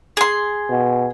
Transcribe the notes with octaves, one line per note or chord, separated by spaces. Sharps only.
G#4 C6
B2